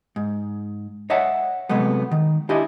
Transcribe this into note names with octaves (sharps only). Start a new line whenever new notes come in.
G#2
C#5 D#5 E5 F#5 A5
C3 F#3 G#3 A3 B3
D#3
D4 E4 F4 G4 D#5 G#5